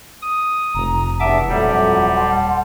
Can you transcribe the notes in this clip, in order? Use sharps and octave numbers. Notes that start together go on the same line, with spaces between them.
D#6
F1 A#5
E2 G2 E5 F#5 A5 D6
D#1 F2 F#3 G3 A3
A5 C6